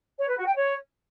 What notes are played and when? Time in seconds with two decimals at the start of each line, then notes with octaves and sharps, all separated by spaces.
0.18 C#5
0.28 B4
0.37 F#4
0.47 G5
0.56 C#5